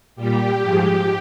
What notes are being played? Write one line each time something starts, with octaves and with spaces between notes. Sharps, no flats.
A#2 G3 G4
G#2 F3 G#3